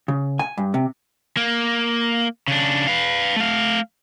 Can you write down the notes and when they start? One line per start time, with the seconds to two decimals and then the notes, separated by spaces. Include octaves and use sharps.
0.08 C#3
0.39 G#5
0.58 G2
0.74 C3
1.37 A#3
2.48 C#3 D4
2.87 B4 F5
3.37 A3 F5